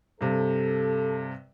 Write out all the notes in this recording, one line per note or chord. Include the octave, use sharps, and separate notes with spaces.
G2 C3 A4